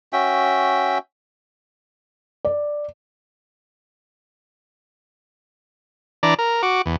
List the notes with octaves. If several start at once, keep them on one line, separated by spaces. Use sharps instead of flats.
C#4 F#4 E5 G5
D5
E3 D4 D5 A#5
A#4
F#4 D6
E2